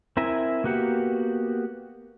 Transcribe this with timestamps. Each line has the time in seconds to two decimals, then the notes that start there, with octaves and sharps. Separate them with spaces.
0.17 C4 E4 A#4 E5 G#5
0.64 A#3 B3 F#4 G4 F#5